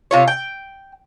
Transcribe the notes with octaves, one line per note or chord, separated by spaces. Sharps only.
C3 F4 C#5
G5